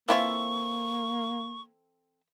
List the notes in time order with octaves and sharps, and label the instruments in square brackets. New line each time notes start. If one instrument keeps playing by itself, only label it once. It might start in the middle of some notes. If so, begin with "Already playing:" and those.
[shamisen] E3 E4 F4 [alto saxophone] A#3 [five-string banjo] C4 A4 E5 [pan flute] C#6